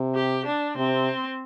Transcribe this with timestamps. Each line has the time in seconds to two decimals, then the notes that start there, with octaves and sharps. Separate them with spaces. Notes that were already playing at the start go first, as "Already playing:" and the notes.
Already playing: C3
0.15 G4
0.46 D4
0.77 C3 C4